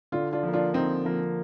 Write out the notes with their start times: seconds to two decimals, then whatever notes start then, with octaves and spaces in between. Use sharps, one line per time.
0.12 D3 D4 F4
0.33 D4 F4
0.43 F3
0.48 A#3
0.53 D4 F4
0.74 D3 C4 D#4
1.05 F3 A#3